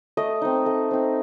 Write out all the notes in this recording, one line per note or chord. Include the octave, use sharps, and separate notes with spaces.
A3 D#5
C4 D#4
A3
C4 D#4